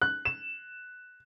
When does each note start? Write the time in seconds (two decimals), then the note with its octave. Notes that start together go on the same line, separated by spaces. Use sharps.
0.02 F#6
0.25 E7